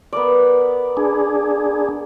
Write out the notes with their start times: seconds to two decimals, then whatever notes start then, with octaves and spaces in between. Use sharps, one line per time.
0.13 B3 A#4 D5
0.97 D4 G#4